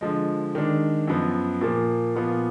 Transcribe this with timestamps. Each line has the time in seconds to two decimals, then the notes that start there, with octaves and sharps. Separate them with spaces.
0.01 D3 F3 G#3
0.55 D#3 G#3 D4
1.07 F#2 F3 B3
1.61 A#2 F3 A#3
2.16 A#2 F3 B3 F4